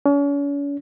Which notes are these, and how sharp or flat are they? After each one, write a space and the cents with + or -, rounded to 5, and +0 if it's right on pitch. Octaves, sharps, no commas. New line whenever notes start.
C#4 +40